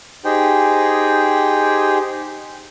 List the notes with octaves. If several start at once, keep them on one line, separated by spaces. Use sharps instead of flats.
D#4 G4 G#4 C5 G5